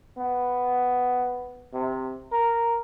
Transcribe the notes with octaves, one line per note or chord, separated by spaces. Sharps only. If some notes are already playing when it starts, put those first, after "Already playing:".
B3
C3
A#4